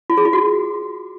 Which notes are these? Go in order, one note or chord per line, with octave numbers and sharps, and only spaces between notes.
F4
G#4
F4
F#4